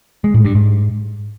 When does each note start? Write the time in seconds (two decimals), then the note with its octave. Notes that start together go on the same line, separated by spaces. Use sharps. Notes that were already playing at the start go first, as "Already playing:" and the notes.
0.24 G#3
0.34 A2
0.45 G2
0.55 G#2